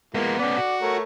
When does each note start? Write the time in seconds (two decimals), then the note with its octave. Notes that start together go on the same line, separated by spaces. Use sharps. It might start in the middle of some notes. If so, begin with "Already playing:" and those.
0.14 G#3 A#3 B3 F4
0.39 B3 C#4 D5 F#5
0.57 F#4
0.82 A3 A#4 C#5